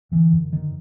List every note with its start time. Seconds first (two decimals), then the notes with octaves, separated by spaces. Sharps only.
0.12 D3 E3
0.33 F#2
0.53 D3 D#3